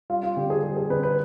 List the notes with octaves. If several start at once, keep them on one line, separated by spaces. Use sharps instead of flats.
G3 F4
F4
D3 G4
G#4
G3 G#4
G#4
D3 B4
B4